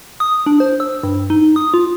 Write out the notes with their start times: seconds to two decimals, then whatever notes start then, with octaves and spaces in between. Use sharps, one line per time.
0.20 D#6
0.46 D4
0.60 C5
0.80 E6
1.03 G2
1.30 D#4
1.56 D#6
1.74 F4